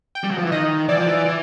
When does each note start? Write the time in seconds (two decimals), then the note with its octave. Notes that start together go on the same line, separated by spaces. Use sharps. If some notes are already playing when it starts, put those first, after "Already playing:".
0.15 G5
0.24 G3
0.31 F#3
0.38 F3
0.45 E3
0.52 D#3 D#5
0.89 E3 D5
0.98 F3
1.07 E3
1.25 E3